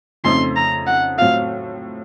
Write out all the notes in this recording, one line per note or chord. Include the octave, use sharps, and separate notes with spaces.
F2 C#3 A3 C4 D#4 C6
A#5
F#5
A2 F#3 C4 F4 F5